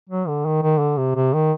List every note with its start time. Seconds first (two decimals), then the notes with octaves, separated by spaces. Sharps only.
0.09 F#3
0.28 D3
0.46 D#3
0.63 D#3
0.80 D3
0.98 C3
1.15 C3
1.34 D#3